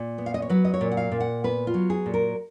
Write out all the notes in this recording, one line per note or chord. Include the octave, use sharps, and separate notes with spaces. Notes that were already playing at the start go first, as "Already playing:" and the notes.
Already playing: A#2
B3
F5
D#5
C#5
F#3 B4
D#5
C#5
A#2
F#5
F5
A#2
F#5
B3 B4
F4
F#3
G#4
A#2
A#4